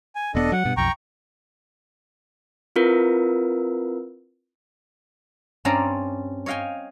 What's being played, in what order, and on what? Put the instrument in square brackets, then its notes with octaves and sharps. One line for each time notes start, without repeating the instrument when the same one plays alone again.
[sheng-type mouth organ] G#5
[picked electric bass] E1 B3 [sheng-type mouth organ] D4 A4 D#5
[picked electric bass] F#3 [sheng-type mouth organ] F#5
[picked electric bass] G2 B2
[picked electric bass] B1 F2 [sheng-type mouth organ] G5 A#5 C#6
[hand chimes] C4 E4 F4 A#4 B4
[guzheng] G2 C4 C#4 C#5 D5 A#5
C#5 D#5 F5 G5 G#5